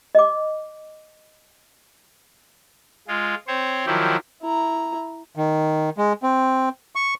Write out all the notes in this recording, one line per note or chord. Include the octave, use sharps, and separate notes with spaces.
D#5 D6
G#3 F4
C4 C5 C#5
D#3 F3 F#3 E4 G4
E4 A#5
D#3
G#3
C4
C#6